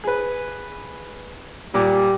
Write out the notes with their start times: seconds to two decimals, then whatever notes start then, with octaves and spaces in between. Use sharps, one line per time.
0.04 G#4 B4
1.74 A#2 G3 D6